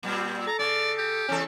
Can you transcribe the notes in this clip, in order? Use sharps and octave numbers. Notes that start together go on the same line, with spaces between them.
A#2 G3 C4
A4 A#5
C#3 D5
G4
E2 C#3 C#4 A4